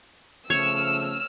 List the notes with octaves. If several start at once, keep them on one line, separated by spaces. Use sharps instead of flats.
C#3 F3 A3 C#5 E6 F6